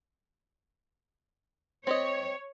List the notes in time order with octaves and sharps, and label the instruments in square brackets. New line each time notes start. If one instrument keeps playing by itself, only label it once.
[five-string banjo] C4 G4 D#5 [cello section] C#5